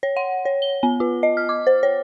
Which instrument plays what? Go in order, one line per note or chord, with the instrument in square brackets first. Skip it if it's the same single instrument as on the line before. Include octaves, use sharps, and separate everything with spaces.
[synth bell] C#5
F#5
C#5
G7
B3
F4
D#5
F6
D6
C5
C#5